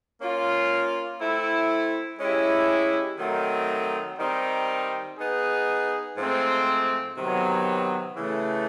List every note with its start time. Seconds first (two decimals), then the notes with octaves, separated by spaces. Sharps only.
0.20 A#3 C#4 F4
1.20 A3 C4 E4
2.19 G#3 C#4 E4 G4
3.19 D#3 F#3 A3 C4 D#4
4.18 D#3 G3 C4 D#4
5.17 B3 D#4 G#4
6.17 G#2 F3 A3 C4
7.17 C3 D#3 F#3 B3
8.17 C#3 E3 A3